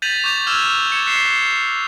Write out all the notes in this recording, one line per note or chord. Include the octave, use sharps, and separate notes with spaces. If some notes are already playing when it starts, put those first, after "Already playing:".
G6 A6 B6 D#7 F7 F#7
C#6 D6 G6 D#7 F7
D6 E6 F6 G#6 E7 F7
G#6 C#7 E7
F#6 B6 C7 E7 G7